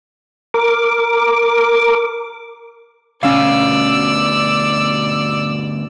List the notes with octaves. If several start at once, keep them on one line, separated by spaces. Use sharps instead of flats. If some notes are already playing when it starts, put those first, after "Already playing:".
A#4 D6
D2 B2 C#4 D5 F5 E6